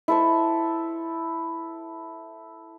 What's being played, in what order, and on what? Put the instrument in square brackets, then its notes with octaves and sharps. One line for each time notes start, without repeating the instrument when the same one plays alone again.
[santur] E4 A4 C5